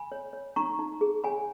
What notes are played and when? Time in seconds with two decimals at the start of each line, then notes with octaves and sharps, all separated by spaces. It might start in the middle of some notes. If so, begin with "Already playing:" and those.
Already playing: G#5 B5
0.12 C#5
0.33 C#5
0.56 D#4 A#5 C#6
0.79 D#4
1.01 G#4
1.24 C#5 G#5 B5